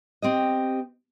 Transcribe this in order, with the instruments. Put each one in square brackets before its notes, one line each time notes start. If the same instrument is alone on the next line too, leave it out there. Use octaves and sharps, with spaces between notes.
[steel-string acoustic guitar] C4 G4 D#5